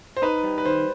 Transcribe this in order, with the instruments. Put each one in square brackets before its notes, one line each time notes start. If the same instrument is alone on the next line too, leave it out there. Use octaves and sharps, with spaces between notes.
[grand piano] C5
[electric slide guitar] D#4 [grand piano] B4
[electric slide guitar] G3
[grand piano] B4
[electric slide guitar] D#3 [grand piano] C5